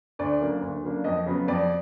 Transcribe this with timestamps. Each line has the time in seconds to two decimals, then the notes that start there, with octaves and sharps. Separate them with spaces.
0.19 D2 D5
0.40 C#3 F#3 A#3 D4
0.62 D2
0.83 C#3 F#3 A#3 D4
1.04 F2 D#5
1.26 C#3 F#3 B3
1.48 F2 D5